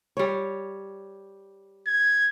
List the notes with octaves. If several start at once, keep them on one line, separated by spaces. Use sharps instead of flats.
G3 C#5
G#6